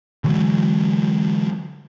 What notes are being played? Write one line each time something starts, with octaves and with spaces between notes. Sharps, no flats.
D3 E3 F#3 G#3